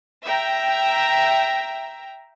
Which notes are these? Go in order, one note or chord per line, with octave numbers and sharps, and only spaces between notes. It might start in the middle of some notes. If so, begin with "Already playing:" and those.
E5 G5 A#5